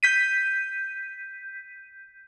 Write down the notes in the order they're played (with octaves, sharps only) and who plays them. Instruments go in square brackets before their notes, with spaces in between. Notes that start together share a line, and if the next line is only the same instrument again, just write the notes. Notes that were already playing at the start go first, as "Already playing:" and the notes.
[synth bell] G6 B6 D#7